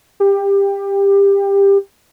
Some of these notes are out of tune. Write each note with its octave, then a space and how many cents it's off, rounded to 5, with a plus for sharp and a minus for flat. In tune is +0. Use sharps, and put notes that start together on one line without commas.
G4 +20